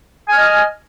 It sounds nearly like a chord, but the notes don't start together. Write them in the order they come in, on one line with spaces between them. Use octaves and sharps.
G#5 F6 D#5